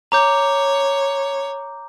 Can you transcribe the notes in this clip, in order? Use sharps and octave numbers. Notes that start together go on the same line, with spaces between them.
C#5 A#5 D6 G6